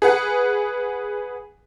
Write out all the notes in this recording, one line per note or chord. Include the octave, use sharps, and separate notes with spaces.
G#4 B4 F#5